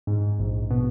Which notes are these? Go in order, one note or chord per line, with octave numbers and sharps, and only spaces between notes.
G#2
A#1
B2